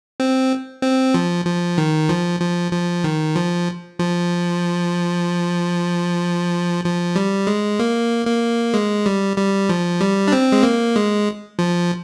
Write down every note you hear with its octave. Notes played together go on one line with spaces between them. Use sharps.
C4
C4
F3
F3
D#3
F3
F3
F3
D#3
F3
F3
F3
G3
G#3
A#3
A#3
G#3
G3
G3
F3
G3
D4
C4
G#3
A#3
G#3
F3